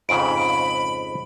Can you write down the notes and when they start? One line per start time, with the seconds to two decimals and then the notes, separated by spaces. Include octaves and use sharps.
0.09 F2 G#2 C#3 B5 D7